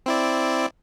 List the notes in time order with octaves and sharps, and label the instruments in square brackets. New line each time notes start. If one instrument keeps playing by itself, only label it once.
[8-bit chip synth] C4 E4 D5